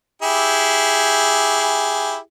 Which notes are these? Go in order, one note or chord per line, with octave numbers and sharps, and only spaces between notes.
E4 G4 G#4